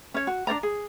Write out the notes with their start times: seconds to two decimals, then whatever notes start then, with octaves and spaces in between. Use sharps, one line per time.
0.14 C#4 C#5
0.27 F#4
0.47 D4 C5 D5 A#5
0.63 G#4